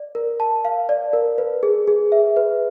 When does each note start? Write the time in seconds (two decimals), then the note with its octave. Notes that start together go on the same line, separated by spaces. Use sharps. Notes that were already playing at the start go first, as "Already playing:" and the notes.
Already playing: D5
0.15 A#4
0.40 A5
0.65 F5
0.89 D5
1.13 A#4
1.38 B4
1.63 G#4
1.87 G#4
2.12 E5
2.37 B4